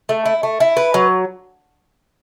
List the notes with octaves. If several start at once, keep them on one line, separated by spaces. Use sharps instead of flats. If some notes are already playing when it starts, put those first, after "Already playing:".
A3
E4
A3
E4
B4
F#3